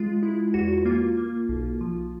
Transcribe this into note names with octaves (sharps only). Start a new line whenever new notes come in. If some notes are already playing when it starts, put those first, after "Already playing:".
Already playing: G#3 F4
G#3 E4
E2 F#4
A#3 F4
A#3
B1
F3